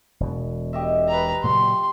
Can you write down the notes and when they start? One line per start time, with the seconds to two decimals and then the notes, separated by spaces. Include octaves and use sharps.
0.20 E1 B2
0.73 G4 D#5 E5
1.09 B4 A#5
1.44 A#2 C#3 F#3 C6